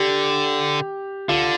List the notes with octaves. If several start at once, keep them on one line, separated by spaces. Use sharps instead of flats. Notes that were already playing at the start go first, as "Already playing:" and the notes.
Already playing: D3 G4
D3 F4